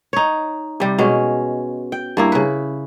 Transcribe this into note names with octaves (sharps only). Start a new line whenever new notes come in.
D#4 C#5
C3 G3
B2 G#3 C#4
G5
G2 A#3 E4
C#3 B4